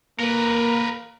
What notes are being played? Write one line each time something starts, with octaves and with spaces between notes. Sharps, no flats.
A#3 A#4 B4